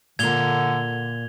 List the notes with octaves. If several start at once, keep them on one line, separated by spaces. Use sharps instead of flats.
A#2 D3 A#4 G#6 F7 G7